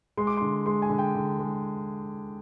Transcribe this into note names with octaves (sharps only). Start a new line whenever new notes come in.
G#3 C6
D6
D3 C6
G#3 C6
G#5
D3
G5
D3
G#3